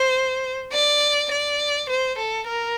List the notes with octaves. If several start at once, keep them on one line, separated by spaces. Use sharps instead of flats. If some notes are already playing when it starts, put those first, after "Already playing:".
Already playing: C5
D5
D5
C5
A4
A#4